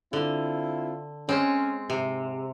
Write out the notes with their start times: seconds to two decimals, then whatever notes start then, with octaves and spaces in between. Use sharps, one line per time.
0.13 D3 C4 E4 F4
1.29 G#3 C4 C#4
1.90 G#2 C3